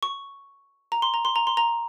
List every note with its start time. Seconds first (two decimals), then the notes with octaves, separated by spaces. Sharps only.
0.03 C#6
0.92 A#5
1.02 C6
1.14 A#5
1.25 C6
1.36 A#5
1.47 C6
1.57 A#5